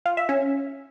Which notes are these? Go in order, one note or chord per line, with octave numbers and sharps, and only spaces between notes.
F4
E5
C#4